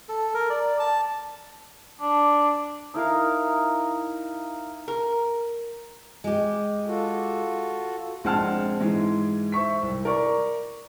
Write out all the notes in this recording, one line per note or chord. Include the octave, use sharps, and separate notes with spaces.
A4
A#4
D5
A5
D4
D#4 E4 A#4 F5
A#4
G#3 G4
F4 F#4 A4
A#1 G#3 C4 F#5 A5 F6
G#2 E3 G#3
C5 E5 C#6 B6
C2
A#4 D5 C#6